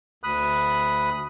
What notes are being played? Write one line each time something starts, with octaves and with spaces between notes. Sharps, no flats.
D2 B5 D#6 F#6